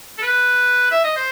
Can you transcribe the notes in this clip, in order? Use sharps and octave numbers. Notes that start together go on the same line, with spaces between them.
A4
B4
E5
D#5
C5